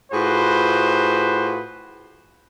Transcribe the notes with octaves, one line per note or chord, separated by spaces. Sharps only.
A2 F4 F#4 G#4 B4 C5